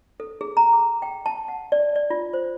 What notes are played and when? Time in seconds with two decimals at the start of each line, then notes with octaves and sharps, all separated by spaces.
0.20 A4
0.41 G#4
0.57 A#5
0.73 D6
1.02 G5
1.26 A5
1.48 F#5
1.72 D5
1.96 D5
2.10 F4
2.33 C5